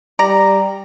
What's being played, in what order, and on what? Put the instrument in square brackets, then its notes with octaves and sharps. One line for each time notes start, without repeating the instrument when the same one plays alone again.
[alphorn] G3 [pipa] D5 A#5